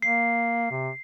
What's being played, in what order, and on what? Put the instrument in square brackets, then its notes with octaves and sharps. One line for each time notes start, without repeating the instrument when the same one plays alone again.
[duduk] A#3 [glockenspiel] C7
[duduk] C3